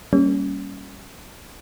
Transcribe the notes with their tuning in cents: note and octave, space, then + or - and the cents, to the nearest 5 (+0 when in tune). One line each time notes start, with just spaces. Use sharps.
G3 +0 A#3 +0 C#4 +0